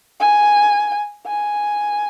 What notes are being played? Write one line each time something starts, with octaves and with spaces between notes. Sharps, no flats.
G#5
G#5